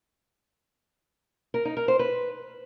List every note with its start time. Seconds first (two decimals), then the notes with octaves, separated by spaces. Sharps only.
1.54 A#4
1.65 D#4
1.77 A#4
1.88 C5
1.99 B4